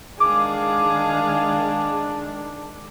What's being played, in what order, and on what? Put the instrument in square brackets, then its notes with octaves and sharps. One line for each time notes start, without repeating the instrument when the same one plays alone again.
[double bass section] D#3 G#3 [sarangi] D4 [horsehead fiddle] G#4 F5 [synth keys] D6